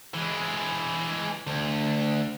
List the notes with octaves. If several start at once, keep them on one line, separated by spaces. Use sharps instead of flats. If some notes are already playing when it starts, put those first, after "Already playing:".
E3 G#3
D2